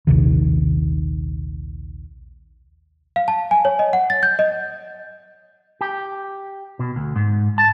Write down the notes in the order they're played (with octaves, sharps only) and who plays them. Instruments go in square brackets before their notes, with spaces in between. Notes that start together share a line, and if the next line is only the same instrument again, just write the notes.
[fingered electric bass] A#1 D#2 C3 D#3
[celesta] F5
A5
G#5
C#5
D#5
F#5
A6
G6
D#5
[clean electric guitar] G4
B2
D2
G#2
A5